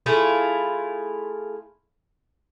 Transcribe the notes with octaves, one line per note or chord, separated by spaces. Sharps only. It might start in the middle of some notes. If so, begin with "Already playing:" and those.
A3 E4 F4 G#4